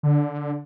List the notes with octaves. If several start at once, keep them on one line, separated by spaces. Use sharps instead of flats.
D3